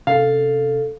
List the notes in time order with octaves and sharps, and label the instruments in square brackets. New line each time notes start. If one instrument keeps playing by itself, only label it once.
[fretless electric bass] C3 C#4 [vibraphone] A4 [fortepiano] F5